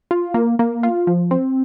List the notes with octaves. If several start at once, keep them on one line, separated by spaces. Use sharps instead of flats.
F4
A#3
A#3
F4
F3
C4